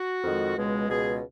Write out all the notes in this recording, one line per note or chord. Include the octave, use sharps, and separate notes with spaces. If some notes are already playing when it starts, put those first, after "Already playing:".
Already playing: F#4
F2 D#3 G#3
C#2 B2 G#3
C#2 B2 G#3 G#4